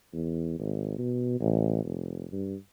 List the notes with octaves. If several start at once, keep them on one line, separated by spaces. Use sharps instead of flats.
E2
G#1
B2
A1
F1
G2